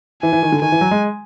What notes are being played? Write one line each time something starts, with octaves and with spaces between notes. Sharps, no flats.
E3 G#5
E3
D#3
D3
D#3 G#5
E3
F#3
G#3